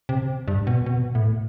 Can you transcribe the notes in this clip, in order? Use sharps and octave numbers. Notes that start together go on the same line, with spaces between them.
C3
G2
B2
B2
A2